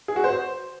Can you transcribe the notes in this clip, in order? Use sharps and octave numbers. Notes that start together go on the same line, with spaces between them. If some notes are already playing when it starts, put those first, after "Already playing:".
G#4
F#4
C5